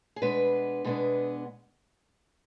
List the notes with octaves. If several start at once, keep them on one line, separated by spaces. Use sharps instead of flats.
G#4
B2 G#3 B3 D4 B4
B2 G#3 B3 D4